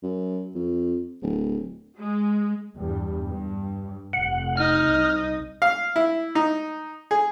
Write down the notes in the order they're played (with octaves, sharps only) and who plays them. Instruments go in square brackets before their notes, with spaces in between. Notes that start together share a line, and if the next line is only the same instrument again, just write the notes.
[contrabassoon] F#2
F2
D1
[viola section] G#3
[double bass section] E2 G2 G3
G2
[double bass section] F1 [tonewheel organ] F#5
[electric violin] D#4 D#5 [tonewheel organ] F6
[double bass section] C2
[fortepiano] F5
E4
D#4
G#4